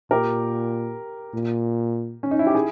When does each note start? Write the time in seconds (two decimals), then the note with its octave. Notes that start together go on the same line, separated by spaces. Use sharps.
0.11 A#2 G4 A#4
1.34 A#2
2.23 C#4
2.31 D#4
2.39 E4
2.47 G4
2.55 E4 G#4